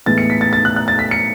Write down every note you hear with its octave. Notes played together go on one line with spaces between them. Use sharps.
A2 E3 G#3 B3 A6
C#7
B6
A6
A6
F#6
F#6
A6
B6
C#7